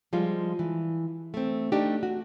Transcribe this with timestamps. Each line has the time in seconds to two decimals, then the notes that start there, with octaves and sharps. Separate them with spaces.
0.13 F3 G3 G#3 F4
0.59 E3
1.34 A3 C4
1.72 A3 D4 D#4 G4
2.03 F#4